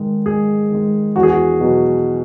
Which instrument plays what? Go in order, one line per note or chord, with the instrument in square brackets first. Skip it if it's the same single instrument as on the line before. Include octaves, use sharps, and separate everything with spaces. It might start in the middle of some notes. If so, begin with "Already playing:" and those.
Already playing: [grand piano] G#2 D#3 G#3
G#2 G#4
D#3 G#3
E2 F#4
G#4
F#4
B2 F#3